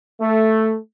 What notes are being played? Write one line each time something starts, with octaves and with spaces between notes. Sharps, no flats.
A3